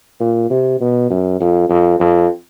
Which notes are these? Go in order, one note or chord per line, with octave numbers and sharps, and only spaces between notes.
A#2
C3
B2
F#2
F2
F2
F2